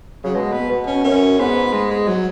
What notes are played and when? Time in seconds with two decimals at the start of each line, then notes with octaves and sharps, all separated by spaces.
0.24 C#3 F#3
0.35 B2 G#3
0.52 B3
0.69 B2
0.86 C#4
1.04 F#2 C#4
1.39 G#2 B3
1.73 G#3
1.91 G#3
2.08 F#3